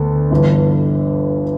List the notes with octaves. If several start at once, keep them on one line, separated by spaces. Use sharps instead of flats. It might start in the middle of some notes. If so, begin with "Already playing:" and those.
Already playing: D2 D3 B3
G1 G2 E3